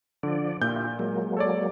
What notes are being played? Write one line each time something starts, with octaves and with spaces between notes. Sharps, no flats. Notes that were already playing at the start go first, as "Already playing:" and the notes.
D3 F3 D5
A#2 E4 F4 G4 G6
F#3 G#3 A#3
A4 C#5 D5